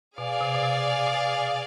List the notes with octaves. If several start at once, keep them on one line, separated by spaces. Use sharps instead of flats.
B2 G#4 D5 F5
C3
B2
C3
B2